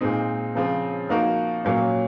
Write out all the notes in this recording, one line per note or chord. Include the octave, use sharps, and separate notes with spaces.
A#2 G#3 C4 D#4
C#3 F3 C4
F3 A#3 D#4 F#4 A#4
A#2 F#3 A#3 C#4 F4